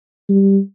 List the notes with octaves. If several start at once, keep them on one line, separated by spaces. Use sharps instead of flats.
G3